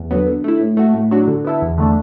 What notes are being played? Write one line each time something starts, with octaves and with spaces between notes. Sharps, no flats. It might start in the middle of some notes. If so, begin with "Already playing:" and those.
Already playing: E2
D3 F#3 B3
D3
A3 E4
A2
A3 F#4
A2
F#3 D4 F#4
D3
B3 E4 A4
E2
D3 A3 D4